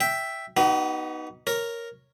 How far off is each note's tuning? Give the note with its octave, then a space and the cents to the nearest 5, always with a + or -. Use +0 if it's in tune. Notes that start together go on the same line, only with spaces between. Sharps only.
E5 +0 G5 +0
B3 -15 D#4 +0 F#4 +45
A#4 +0 C#5 +0